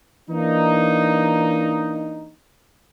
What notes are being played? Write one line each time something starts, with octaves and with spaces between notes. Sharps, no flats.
E3 A#3 D4 D#4